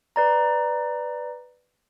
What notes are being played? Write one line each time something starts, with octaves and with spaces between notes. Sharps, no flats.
B4 D5 A#5